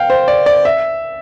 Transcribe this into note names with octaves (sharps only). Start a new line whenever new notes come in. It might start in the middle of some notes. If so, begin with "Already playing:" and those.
Already playing: F5 G5
C5
D5
D5
E5